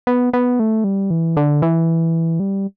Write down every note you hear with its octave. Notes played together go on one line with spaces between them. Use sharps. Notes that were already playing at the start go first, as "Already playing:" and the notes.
B3
B3
A3
G3
E3
D3
E3
G3